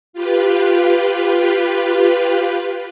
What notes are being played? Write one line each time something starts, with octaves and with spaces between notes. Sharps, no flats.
F4 G4 B4